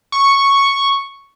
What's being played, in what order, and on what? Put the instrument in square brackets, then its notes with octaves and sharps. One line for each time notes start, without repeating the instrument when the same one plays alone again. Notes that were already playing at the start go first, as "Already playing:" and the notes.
[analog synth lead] C#6